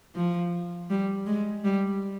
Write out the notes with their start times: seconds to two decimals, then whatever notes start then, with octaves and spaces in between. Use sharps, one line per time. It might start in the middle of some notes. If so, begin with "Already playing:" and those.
0.15 F3
0.90 G3
1.26 G#3
1.64 G3